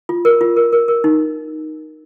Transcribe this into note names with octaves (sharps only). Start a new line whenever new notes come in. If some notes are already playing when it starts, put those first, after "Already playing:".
F4
A#4
F4
A#4
A#4
A#4
D#4